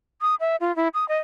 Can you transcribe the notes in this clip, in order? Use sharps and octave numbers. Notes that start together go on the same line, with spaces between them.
D#6
E5
F4
E4
D#6
D#5